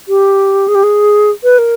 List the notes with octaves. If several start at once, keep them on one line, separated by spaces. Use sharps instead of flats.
G4
G#4
G4
G#4
B4
A#4